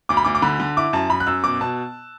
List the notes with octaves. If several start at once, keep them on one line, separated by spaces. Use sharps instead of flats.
D2 D6
B5
D2 D6
D6
D3 B5
D3
E4 D6
F#2 A5
F#2 B5
F#6
F#2 E6
B2 D6
B2 A5